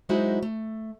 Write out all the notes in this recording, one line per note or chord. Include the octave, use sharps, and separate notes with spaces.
F#3 G#3 D#4 E4 F#4 C5
A3